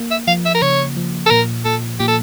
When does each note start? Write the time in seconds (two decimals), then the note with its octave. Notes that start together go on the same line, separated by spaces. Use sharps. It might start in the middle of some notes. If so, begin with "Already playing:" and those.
Already playing: A#3
0.11 E5
0.27 F3 F5
0.45 E5
0.54 A#4
0.62 C#3 C#5
0.96 F3
1.26 A4
1.31 A#2 A#4
1.65 A#2 A4
1.99 A#2 G4
2.08 A4